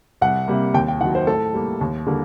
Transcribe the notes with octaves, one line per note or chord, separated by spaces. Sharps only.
C2 F#5
C3 G3 A#3
D#2 G5
G5
D#3 F#3 F#5
C5
A2 A4
G3 A#3
D#2
D3 G3 A#3